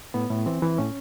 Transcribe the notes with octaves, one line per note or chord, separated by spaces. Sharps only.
A2 B3
A2
E3 C4
E3
A2 C#4